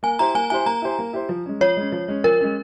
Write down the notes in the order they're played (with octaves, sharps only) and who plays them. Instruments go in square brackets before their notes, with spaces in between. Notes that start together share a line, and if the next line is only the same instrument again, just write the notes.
[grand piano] A#3 [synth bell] G#5
[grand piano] E4 G4 C5 [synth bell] A#5
[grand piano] A#3 [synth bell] G#5
[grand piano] E4 G4 C5 [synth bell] G#5
[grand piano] A#3 [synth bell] A#5
[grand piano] E4 G4 C5
A#3
E4 G4 C5
F3
G#3 C#4
[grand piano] F3 [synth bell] C#5
[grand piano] G#3 C#4
F3
G#3 C#4
[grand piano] F3 [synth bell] A#4
[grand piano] G#3 C#4